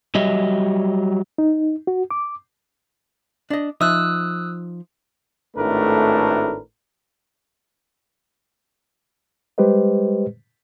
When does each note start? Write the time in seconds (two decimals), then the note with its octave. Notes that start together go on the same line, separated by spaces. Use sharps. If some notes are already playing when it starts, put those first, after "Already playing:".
0.15 F#3 G3 G4 C#5 D#5 E5
1.38 D#4
1.87 F#4
2.11 D6
3.50 D4 D#5
3.81 F3 D#4 E5 D#6 E6 F#6
5.56 G#1 A2 A3 D4 A#4 B4
9.58 G3 G#3 G4 B4 C5 D#5